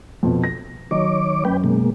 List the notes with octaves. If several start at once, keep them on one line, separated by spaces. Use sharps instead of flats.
F2 B2
A#6
D#3 F#3 C#5 D#5 D6
F#2 B4 G5
B2 G#3 A#3